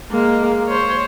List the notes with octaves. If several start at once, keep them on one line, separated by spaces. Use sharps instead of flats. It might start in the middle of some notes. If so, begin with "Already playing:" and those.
G#3 A#3
C5 C#5